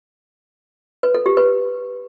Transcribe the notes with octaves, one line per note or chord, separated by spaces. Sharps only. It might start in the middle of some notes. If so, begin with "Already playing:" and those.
B4
A4
G4
B4